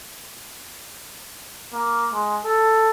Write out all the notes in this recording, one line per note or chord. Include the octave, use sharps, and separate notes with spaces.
A#3
G#3
A4